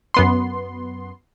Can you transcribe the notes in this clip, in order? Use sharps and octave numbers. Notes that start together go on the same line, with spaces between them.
F#2 B3 C6